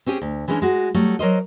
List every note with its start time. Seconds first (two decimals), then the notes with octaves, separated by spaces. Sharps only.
0.06 C4 C#4 G4 G#4
0.22 D2
0.48 E3 G3 G#3 B3 C#4 D4
0.62 G#3 F#4
0.94 F#3 G3 A3
1.19 F#3 A#4 C5 D#5